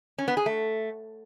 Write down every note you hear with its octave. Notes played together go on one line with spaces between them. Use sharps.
C#4
B3
G#4
A3